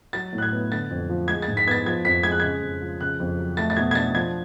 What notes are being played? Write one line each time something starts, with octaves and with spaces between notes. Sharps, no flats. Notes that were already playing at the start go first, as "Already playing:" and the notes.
F#3 A6
A2
F#6
G#6
B3
D3 A6
F2
F3
G#3 G#6
A6
G#2
B6
B3 G#6 A6
F3 G#6
F2 B6
G#3 G#6
F#6
C#3 G#6
F2
F3
C#3 F#6
F2
F#3
A3 A6
A6
B2 G#6
G#6
D4 A6
F3 G#6